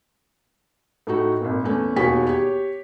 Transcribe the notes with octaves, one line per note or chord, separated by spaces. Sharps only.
A2 A3 D#4 F#4
G#1 A#2
E2 A3 C#4
E1 D#2 F#4 G#4 C#5 B6
G4 C#5